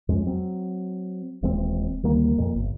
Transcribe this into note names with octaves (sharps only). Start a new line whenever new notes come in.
F2 G#3 C#4
F#3 C4
D#1 E3 G#3 C4
D2 D#3 G3 A#3
F2 A#2
G1